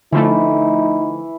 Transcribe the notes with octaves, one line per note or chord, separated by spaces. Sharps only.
D3 E3 F3 A3 D#4